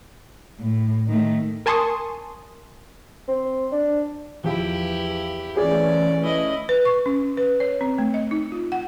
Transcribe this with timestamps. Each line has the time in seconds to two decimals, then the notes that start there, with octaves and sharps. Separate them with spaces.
0.60 A2
1.08 D#3 A3
1.66 A#4 G#5 A5 C6 C#6 D#6
3.28 C4
3.72 D4
4.44 E2 F3 E4 G4
5.57 E3 A3 C#4 G#4 D5
6.22 E4 D#5
6.69 B4
6.85 C#6
7.06 C#4
7.37 B4
7.60 C#5
7.81 C4
7.98 A3
8.14 D#5
8.31 D#4
8.52 F4
8.72 F#5